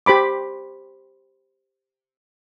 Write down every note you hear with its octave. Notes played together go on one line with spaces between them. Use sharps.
G4 C5 B5 D6